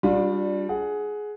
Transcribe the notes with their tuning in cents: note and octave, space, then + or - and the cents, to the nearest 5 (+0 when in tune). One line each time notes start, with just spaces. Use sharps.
G3 +5 D4 +0 F4 +40
G#4 +15 F#5 +0